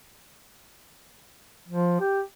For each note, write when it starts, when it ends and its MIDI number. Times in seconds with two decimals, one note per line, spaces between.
1.68 2.00 53
2.00 2.21 67